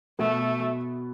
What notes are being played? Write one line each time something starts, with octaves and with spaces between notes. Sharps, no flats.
B2 A3 B3